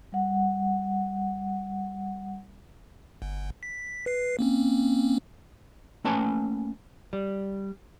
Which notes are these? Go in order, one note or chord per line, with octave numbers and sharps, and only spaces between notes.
G3 F#5
G1
B6
B4 C7
A#3 C4 C#4
A3 A#3 C#4 B4 G#5 A5
G3